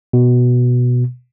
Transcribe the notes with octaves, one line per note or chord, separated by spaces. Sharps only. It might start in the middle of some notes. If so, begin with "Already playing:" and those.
B2